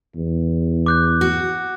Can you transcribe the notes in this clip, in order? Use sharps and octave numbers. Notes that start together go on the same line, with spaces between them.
E2
D6 F#6 G6
F#4